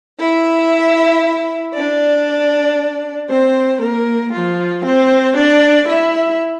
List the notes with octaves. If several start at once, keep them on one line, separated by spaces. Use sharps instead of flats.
E4 E5
D4 D5
C4 C5
A#3 A#4
F3 F4
C4 C5
D4 D5
E4 E5